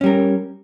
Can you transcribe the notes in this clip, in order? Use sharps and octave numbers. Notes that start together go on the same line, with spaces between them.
G3 C#4 A#4